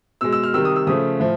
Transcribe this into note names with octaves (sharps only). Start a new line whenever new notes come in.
B2 G#3 E6
E6
F6
C3 D#3 G3 E6
D#6
E6
C#3 F3 A3 D#6
A2 F3